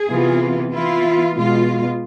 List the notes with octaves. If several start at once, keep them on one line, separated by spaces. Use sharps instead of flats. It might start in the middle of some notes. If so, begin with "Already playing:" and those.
Already playing: G#4
C3 E3 B3 F4
E3 B3 E4 F4
B2 G#3 B3 F4